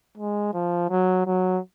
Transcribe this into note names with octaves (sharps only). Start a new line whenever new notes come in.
G#3
F3
F#3
F#3